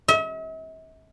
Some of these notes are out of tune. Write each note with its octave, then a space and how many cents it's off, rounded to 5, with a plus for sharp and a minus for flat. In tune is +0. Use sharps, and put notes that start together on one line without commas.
E5 -45